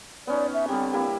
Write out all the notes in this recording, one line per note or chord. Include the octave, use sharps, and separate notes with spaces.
B3 C#4 D#4 D5
E5
D3 G3 C4
G3 A#3 E4